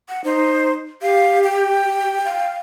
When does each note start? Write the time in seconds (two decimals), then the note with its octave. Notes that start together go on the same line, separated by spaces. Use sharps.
0.09 F#5
0.24 D#4 C5
1.02 G4 F5
1.44 G5
2.25 F5